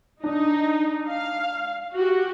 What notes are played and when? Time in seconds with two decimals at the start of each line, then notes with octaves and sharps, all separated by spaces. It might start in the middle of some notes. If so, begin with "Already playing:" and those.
0.24 D4 D#4
1.09 F5
1.95 F#4 G4